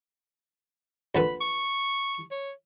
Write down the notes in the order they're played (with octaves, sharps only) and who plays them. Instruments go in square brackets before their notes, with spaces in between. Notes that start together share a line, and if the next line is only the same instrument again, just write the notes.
[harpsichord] A#1 D3 B4 [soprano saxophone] B5
[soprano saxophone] C#6
C#5